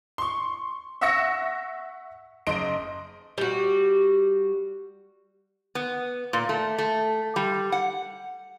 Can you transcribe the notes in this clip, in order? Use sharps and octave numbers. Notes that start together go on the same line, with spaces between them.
C6 C#6
E5 F#5 C#6 E6 A#6 C#7
F#1 D#5 C6 D7
G3 F#4
B3
A#2
A3
A3
G3
F#5